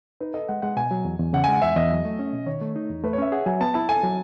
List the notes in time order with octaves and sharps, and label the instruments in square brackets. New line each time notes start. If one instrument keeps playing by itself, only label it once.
[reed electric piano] D#4 [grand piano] B4
[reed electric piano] A4 [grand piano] D#5
[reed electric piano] G#3 [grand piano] F#5
[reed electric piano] G#3 [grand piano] F#5
[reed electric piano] B2 [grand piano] G#5
[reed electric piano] F#3
E2
E2
[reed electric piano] C#3 [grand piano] F#5
[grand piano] G#5
[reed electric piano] G#3 [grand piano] F#5
[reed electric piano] E2 [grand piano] E5
[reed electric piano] E2 [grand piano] D#5
[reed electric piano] F#3
A3
C#4
B2
[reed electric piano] D#3 [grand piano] C#5
[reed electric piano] A3
D#4
E2
[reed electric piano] A3 [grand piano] B4
[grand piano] C#5
[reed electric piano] C#4 [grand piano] E5
[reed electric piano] G#4 [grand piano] F#5
[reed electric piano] F#3 [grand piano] G#5
[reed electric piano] B3 [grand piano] A5
[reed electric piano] E4 [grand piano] A5
[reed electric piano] A4 [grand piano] G#5
[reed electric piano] F#3